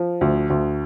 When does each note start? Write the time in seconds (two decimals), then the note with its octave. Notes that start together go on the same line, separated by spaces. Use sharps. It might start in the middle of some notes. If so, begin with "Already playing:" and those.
Already playing: F3
0.21 D2
0.50 D2